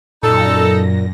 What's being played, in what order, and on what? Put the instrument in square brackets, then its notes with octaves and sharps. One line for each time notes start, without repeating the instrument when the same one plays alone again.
[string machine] F#2 A#6 [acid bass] A#2 [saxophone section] D#4 A4